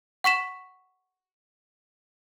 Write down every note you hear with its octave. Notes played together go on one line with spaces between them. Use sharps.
F#5 C#6 B6 E7